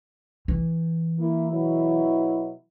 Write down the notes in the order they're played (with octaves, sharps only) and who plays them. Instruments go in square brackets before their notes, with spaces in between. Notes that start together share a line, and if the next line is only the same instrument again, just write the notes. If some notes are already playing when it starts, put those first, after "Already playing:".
[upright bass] E3
[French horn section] A#3 E4
B2 F#3 E4